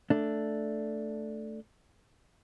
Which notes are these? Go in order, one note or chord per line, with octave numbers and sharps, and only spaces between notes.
A3 D4